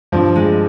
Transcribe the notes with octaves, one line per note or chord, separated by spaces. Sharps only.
G2 F3 C4
G#3